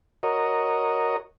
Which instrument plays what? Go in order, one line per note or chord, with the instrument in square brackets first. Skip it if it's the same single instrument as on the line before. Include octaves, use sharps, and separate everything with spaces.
[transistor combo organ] F#4 A#4 C#5 D#5